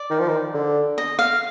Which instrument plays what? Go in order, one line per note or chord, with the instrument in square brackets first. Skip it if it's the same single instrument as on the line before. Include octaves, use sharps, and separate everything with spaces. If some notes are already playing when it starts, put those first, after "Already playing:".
Already playing: [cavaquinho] D5
[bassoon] D#3
F3
D#3
D3
[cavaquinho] D#5
F5